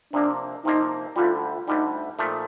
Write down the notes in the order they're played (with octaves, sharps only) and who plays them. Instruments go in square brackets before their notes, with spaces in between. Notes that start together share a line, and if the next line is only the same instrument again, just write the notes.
[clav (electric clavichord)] C3 F3 A#3 [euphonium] D4
[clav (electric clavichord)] C3 F3 A#3 [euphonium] D#4
[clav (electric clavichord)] D2 D3 G3 [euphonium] F4
[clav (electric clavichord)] D2 D3 G3 [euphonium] D#4
[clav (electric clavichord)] A#2 F3 A3